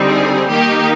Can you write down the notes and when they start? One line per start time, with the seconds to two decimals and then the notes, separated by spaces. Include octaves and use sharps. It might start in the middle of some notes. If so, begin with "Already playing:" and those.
Already playing: D3 G3 C4 D#4
0.08 G#4
0.49 D#3 A#3 D#4 G4